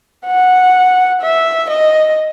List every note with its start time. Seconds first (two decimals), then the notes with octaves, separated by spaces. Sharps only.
0.26 F#5
1.21 E5
1.70 D#5